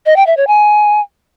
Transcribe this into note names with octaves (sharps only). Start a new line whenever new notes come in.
D#5
G5
E5
C#5
G#5